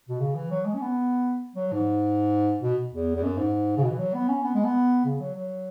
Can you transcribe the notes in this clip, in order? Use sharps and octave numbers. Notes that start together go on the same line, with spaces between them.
B2
C#3
E3
F#3
G#3
C#4
B3
F#3
G#2
B2
E2
E2
F#2
G#2
C#3
B2
E3
F#3
B3
C#4
B3
G#3
B3
C#3
F#3
F#3